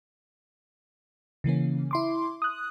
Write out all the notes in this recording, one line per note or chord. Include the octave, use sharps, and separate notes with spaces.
C#3 E3 A#3 C#4
E4 C6 D6
D#6 F#6